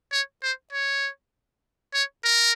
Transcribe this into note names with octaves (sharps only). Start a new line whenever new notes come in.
C#5
C5
C#5
C#5
A#4